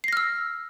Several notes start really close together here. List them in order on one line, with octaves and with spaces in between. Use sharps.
C7 A#6 F6 E6